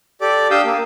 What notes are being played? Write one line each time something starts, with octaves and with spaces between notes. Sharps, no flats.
G4 A4 D5 D6
D4 G4 F5 D#6 E6 G6
A#3